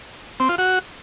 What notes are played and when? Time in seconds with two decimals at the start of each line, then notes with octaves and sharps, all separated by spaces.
0.40 C4
0.49 F4
0.58 F#4